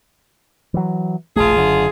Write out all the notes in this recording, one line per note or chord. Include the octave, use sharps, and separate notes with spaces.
E3 F#3
E1 A#1 A3 F4 G#4
F#1 F#2 D3